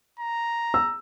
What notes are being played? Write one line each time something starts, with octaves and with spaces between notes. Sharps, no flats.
A#5
E6